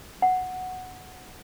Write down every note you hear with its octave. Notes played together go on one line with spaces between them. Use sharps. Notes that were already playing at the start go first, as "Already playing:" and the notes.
F#5